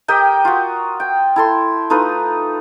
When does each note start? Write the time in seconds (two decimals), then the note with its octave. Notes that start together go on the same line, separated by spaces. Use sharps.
0.08 G4 A#4 D#5 G5
0.45 F4 F#4
1.00 G5
1.36 E4 A4 C6
1.90 A3 D#4 F4 B4